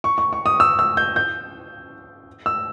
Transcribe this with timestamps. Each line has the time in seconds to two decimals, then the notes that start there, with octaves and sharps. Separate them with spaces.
0.04 C#6
0.18 C#6
0.33 C#6
0.46 D#6
0.60 E6
0.79 E6
0.97 G6
1.16 G6
2.46 E6